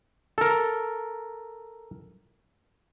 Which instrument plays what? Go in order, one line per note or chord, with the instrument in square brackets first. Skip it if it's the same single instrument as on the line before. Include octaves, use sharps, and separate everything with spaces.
[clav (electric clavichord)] A4 A#4